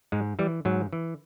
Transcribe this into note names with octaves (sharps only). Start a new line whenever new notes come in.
G#2 G#3
E3 G3
G#2 F#3
E3